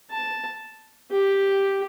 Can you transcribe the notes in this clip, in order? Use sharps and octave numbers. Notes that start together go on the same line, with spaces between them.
A5
G4